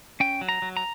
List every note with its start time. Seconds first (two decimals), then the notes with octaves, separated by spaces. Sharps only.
0.20 C#4 G5
0.41 F#3
0.49 A#5
0.62 F#3
0.77 A#5